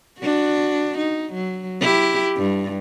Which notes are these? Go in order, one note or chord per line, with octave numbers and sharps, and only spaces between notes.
D4 F#4
D#4
F#3
E4 G4
G2